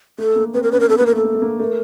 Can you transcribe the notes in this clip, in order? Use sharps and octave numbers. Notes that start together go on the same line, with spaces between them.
A3 A4
A#3
C4 B4
A#4
C#4 B4
A#4
B3 A4
B4
A#3
A#4
A3
A4
A3
A3
A#3
A3 A#4